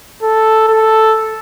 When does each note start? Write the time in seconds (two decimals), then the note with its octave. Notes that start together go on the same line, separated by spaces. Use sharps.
0.23 A4
0.68 A4